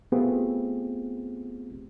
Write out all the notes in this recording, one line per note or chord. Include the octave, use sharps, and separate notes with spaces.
A3 B3 C4 F4 G4 G#4